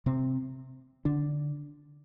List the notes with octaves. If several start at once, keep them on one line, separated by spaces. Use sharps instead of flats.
C3 C4
D3 D4